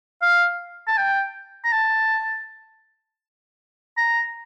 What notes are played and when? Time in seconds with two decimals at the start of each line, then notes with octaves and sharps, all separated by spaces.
0.22 F5
0.87 A5
0.98 G5
1.64 A#5
1.72 A5
3.97 A#5